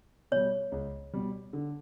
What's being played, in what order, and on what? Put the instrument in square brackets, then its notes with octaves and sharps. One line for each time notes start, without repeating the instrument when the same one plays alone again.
[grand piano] B2 G3 [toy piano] C#5
[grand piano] C#2
B2 G3
D3